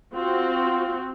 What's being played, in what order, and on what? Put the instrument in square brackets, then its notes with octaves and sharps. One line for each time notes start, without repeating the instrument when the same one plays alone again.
[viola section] C4 F#4 [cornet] F4